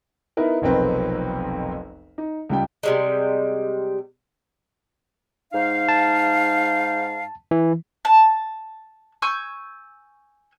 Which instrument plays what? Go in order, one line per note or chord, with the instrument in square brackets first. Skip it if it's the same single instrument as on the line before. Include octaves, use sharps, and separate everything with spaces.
[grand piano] B3 D#4 E4 A#4 B4
F1 B1 F2 C4 A#4 B4
D#4
C#2 G3 G5
[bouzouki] C3 G3 G#3
[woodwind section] G#2 D#4 F5
[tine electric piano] A5
E3
[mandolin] A5
G#5 C#6 E6 G6